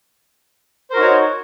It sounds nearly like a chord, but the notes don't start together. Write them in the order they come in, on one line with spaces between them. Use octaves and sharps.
C5 A#4 F#4 D#4 C#5